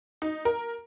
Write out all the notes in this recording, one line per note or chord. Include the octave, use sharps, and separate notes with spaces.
D#4
A#4